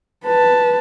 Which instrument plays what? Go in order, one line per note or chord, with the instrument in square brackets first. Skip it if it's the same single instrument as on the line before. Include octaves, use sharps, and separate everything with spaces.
[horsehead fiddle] B4 A5